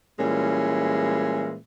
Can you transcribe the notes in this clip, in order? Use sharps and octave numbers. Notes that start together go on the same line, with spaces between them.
A#2 E3 G3 G#3 C#4 E4